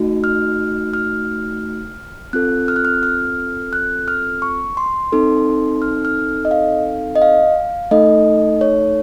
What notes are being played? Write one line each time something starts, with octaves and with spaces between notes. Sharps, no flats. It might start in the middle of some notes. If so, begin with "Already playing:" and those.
Already playing: A3 D#4 F#4
F6
F6
C4 F4 A4 F#6
F6
F#6
F6
F6
F#6
F6
C#6
C6
C4 D#4 A4
F6
F6
D#5
F5
D#5
F5
A3 D#4 A4 D#5
C#5